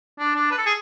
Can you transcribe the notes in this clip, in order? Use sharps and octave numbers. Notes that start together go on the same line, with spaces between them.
D4
D4
B4
A4
G#4